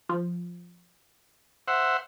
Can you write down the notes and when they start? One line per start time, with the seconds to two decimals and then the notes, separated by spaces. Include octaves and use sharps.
0.09 F3
1.68 C5 E5 F#5